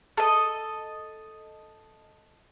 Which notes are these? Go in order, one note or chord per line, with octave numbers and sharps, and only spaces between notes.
A4 D#5